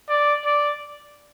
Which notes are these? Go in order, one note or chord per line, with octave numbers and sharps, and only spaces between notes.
D5
D5